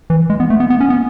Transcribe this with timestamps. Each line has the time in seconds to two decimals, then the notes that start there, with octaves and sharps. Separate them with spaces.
0.10 E3
0.30 G#3
0.40 B3
0.50 A3
0.60 B3
0.70 B3
0.81 C#4
0.90 B3